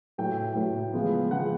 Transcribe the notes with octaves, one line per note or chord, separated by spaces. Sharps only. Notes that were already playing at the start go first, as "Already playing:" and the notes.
A2 F#3 A3 G5
A2 F#3 A3
C#3 F3 G#3 B3
C#3 F3 G#3 B3 F#5